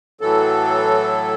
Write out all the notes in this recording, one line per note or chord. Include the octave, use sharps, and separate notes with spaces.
A2 E3 F#3 A4